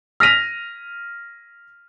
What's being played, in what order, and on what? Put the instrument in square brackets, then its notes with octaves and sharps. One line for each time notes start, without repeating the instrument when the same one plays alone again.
[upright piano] F6 A#6 B6 D#7 F7